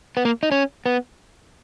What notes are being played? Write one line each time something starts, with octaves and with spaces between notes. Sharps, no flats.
B3
A#3
D#4
C#4
B3